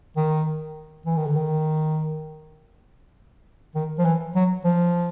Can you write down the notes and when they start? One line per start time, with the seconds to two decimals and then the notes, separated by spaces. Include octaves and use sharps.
0.16 D#3
1.06 E3
1.17 D#3
1.27 D3
1.36 D#3
3.75 D#3
3.98 F3
4.05 E3
4.35 F#3
4.64 F3